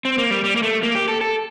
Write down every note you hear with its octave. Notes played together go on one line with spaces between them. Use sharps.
C4
A#3
G3
G3
A#3
A3
A#3
G4
A4
A4